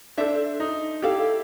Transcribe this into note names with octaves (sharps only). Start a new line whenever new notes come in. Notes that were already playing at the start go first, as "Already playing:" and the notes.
D4 A4 C5 E5
D#4
E4 G4 A4 D5 F5